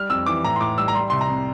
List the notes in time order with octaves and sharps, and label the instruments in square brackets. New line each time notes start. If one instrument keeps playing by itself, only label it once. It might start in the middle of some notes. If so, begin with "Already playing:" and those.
Already playing: [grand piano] G3 F6
F2 E6
E3 D6
A2 A#5
C6
A2 D6
G3 E6
A#5
G3 C6
C2 C6
A#5
C3